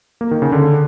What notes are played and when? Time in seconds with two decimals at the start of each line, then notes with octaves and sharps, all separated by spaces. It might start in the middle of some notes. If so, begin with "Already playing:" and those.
0.21 A#3
0.31 D#3
0.42 C#3
0.52 D3